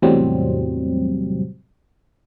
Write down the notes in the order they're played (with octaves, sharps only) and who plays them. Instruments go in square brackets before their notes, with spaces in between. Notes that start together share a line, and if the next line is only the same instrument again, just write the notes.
[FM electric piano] E2 A2 C3 F#3 G3 C4